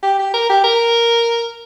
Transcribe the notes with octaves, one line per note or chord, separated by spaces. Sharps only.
G4
G4
A#4
G4
A#4